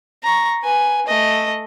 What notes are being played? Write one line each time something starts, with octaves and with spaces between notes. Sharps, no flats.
A#5 C#6
B4 G#5
A3 D#5